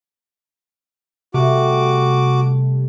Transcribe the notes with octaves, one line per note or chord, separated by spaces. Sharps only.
C3 G3 A3 F#4 D6